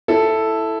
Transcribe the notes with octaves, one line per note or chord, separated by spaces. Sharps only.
E4 A4